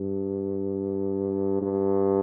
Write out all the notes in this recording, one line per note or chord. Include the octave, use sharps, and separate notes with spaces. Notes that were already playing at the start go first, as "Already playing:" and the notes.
Already playing: G2
G2